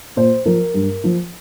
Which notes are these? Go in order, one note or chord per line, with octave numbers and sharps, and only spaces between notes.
A#2 C5
F3 A#4
G2
F3